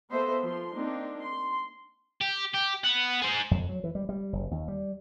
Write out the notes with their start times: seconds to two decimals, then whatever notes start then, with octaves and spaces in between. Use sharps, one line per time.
0.11 A#3 B3 A4 C5 D#5 E5
0.43 F3 C6
0.74 A#3 C4 D4 D#4
1.20 C6
2.21 G4
2.54 G4
2.84 B3 F#5
3.22 G#4 C5
3.51 F2
3.69 F#3
3.84 E3
3.95 G3
4.09 G3
4.33 F#1
4.51 D#2
4.68 G3